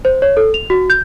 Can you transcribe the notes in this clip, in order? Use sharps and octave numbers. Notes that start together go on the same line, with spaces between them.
C5
C#5
A4
F7
F#4
G6